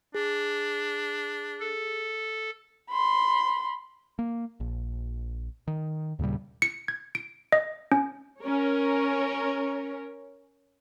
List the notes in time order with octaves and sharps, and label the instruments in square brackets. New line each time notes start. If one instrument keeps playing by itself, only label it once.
[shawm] D4 [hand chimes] G#4
[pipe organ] A4
[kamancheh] B5 C6
[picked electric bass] A#3
A#1
D#3
D#2 A#2 C#3 G3
[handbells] C#7
G#6
D7
D#5
C#4
[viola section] C#4 A#4 C#5